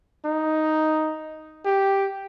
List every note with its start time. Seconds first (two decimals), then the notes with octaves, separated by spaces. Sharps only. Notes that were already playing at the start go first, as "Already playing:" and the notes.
0.25 D#4
1.65 G4